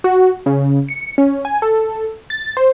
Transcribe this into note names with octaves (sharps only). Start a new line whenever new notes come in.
F#4
C#3
C#7
C#4
G#5
A4
A6
C5